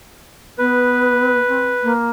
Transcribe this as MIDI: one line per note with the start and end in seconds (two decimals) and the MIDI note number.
0.58 1.41 59
0.58 1.93 71
1.48 1.70 60
1.83 2.11 58